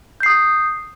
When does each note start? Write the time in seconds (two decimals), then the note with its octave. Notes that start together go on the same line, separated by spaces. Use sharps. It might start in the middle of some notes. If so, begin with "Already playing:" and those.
0.20 G6
0.23 C7
0.26 D#6